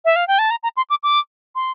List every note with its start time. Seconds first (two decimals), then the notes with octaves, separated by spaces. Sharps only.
0.05 E5
0.16 F5
0.28 G5
0.39 A5
0.51 A#5
0.63 A#5
0.77 C6
0.90 D6
1.03 D6
1.55 C6